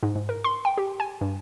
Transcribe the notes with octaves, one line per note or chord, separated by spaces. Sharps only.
G#2
G#2
A#4
C6
G5
G4
G#5
G2